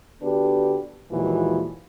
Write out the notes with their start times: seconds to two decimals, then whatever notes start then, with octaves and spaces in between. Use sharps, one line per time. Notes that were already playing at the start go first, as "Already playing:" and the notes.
0.22 D3 B3 D4 F#4 G4 B4
1.12 D#2 A#2 E3 F3 G#3 F#4